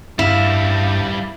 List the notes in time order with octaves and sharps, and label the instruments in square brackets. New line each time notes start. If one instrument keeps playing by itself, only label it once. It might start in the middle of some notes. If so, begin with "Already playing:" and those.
[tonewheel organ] G2 [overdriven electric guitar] G3 F5 [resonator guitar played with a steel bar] E4